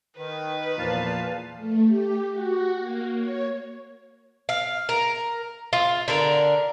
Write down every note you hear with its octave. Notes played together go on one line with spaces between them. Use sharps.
D#3 B4
E2 A#2 F3 F5 A5
A3
G4
F#4
A#3
C#5
F5
A#4
F4
D3 A#4